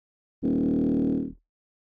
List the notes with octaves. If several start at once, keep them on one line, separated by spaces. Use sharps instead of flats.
D#1